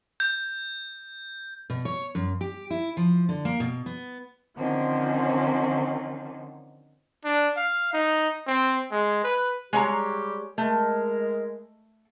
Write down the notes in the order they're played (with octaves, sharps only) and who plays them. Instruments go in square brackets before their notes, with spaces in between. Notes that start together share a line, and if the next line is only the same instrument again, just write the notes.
[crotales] G6
[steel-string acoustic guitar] B2
C#5
F#2
G4
E4
F3
D3
A#3
B2
B3
[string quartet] D3 D#3 F3 C4 C#4
[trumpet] D4
F5
D#4
C4
G#3
B4
[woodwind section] G3 G4 [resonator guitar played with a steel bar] G#3 C#5 A#5
[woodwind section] G#3 A#4 [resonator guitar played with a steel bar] A3